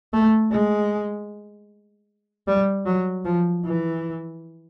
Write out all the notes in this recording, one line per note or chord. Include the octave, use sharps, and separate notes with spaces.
A3
G#3
G3
F#3
F3
E3